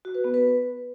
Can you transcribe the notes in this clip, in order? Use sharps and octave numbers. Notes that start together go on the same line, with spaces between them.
F#4
B4
B3
B4